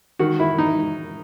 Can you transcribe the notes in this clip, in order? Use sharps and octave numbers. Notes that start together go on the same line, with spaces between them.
D#3 F#4
E4
D#4